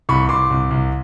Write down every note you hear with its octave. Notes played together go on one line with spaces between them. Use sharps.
C2 B5 C#6
C2 C6 D6
C2
C2